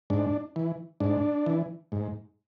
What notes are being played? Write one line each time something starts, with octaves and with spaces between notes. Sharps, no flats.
G#2 D4
E3
G#2 D4
E3
G#2